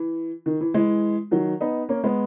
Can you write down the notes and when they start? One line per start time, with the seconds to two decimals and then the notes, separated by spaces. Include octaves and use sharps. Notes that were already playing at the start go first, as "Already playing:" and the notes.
Already playing: E3
0.46 D#3
0.61 E3
0.74 E3 G#3
1.31 D#3 F#3
1.61 B3 D#4
1.89 A#3 C#4
2.04 G#3 B3